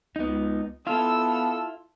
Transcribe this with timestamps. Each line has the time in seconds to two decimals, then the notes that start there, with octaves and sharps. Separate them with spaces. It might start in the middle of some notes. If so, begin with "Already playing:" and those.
0.16 C#2 B3 D#4
0.87 B3 E4 F4 A4 F5 E6